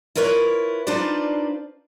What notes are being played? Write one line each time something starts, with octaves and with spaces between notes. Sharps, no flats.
E4 F4 A#4 B4 C#5
D4 D#4 F4 B4 C5 D5